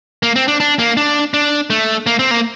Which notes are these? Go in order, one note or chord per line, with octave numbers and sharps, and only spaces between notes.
A#3
C4
D4
D4
A#3
D4
D4
A3
A#3
C4
A#3